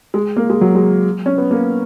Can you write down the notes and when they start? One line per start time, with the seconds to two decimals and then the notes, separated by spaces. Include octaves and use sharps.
0.14 G#3
0.37 A#3
0.50 G#3
0.61 F#3
0.75 G#3
1.26 C#4
1.38 B3
1.51 A#3